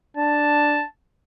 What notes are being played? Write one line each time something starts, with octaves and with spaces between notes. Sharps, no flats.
D4 A5